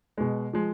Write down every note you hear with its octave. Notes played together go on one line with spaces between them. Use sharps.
B2 G#3
F3 G#3